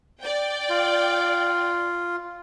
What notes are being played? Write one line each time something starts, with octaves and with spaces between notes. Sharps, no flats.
D5 G5
F4